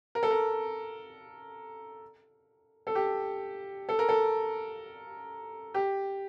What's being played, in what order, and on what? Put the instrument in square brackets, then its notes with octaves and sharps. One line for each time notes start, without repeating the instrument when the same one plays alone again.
[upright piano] A#4
A4
A#4
A4
G4
A4
A#4
A4
G4